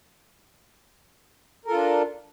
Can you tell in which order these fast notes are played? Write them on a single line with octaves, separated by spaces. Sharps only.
A#4 A4 F4 D4